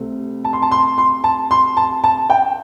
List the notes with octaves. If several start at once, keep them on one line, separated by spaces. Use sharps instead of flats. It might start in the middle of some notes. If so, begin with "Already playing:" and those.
Already playing: C2 C3 A3 C4
A5
C6
A5
C6
C6
A5
C6
A5
A5
G5